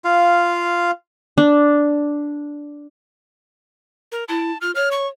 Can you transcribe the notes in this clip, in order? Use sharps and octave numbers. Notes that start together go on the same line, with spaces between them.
F4 F5
D4
A#4
E4 A5
F4 F6
C#5 F6
C#6